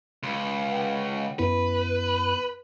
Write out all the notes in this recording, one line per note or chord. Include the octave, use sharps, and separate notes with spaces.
C#2
F#5 G5
F#2 B3 E4 B4